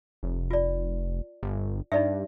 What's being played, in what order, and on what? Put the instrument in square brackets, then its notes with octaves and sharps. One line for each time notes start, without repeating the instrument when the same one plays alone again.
[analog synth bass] F1
[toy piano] F4 D5
[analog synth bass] G1
[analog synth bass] G2 [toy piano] D#4 D5 E5